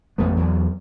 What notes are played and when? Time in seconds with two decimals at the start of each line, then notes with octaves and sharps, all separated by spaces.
0.18 A1 F2 A3 B3
0.37 E2 F#3